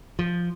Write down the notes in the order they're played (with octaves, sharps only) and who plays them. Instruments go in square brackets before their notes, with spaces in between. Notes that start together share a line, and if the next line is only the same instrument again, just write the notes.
[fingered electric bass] F3